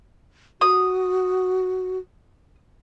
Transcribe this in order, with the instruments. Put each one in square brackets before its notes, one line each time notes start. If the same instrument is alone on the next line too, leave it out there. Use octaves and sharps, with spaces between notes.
[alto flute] F#4 [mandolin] D#6